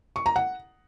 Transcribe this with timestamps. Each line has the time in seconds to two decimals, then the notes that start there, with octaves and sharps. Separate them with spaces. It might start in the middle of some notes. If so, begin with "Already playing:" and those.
0.16 C#6
0.26 A#5
0.36 F#5